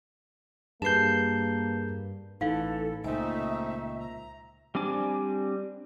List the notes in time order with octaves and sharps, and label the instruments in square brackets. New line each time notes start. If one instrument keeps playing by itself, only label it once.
[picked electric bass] G2 [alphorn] A#3 [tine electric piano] G#4 B4 G6 [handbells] A5 C7
[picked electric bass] A1 E3 [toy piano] D#4 F5 [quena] A4
[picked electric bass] C#2 A#2 [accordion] A3 C4 D#4 [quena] E5 [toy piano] G#5
[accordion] A#5
[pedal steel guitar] G3 C4 D4 G#5 D6